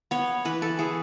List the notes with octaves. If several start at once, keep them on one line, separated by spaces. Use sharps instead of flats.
B3 C#5
E3 B4
A4
E3 G#4